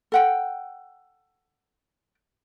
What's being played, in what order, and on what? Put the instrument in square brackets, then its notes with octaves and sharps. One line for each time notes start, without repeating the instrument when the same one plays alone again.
[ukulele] A4 F#5 G5